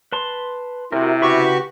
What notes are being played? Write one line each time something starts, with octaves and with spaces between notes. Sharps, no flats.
B4 A5 C6
C3 E4 F#4 A#4
C#3 F#4 G4 B4 B5 C#6